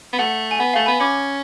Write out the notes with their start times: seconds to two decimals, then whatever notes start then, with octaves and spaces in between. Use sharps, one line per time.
0.13 B3
0.19 A3 F#5
0.51 G#5
0.59 B3 F#5
0.73 A3 F5 G#5
0.86 B3 G#5 B5
1.00 C#4 B5 D6